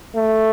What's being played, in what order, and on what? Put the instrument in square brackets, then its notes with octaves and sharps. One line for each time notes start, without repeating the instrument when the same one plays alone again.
[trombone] A3